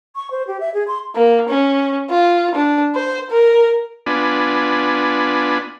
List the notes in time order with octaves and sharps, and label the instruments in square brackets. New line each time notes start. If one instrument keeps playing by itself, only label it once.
[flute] C#6
C5
G4
E5
G#4
C6
[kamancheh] A#3
C#4
F4
D4
C5
A#4
[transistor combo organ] B3 D4 F4 D5 G#5 B5